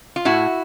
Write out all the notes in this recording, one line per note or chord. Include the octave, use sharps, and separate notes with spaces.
F4
A2 E4 F#4